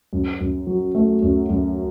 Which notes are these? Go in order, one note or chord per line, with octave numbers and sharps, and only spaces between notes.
F#2
F#2
F#3
A3
F#2
F#2